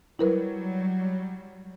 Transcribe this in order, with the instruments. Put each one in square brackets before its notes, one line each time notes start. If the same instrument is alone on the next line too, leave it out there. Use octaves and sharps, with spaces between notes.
[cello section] F#3 G3 [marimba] E4 A#4 B4